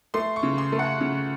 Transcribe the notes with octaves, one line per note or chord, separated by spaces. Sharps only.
A3 C6
C#6
C#3
C6
A3
F#5
C#3